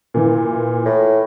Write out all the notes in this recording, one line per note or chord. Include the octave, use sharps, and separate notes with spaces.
A#2 E3
A2